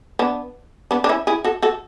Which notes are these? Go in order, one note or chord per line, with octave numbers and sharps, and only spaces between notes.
B3 D4
B3 D4
D4
C#4 E4
E4 G#4
F#4 A4
F#4 A4